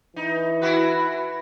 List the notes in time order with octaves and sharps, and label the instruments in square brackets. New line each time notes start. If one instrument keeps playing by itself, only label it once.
[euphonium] E3 [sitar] D#4
[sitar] E4 F#4 B4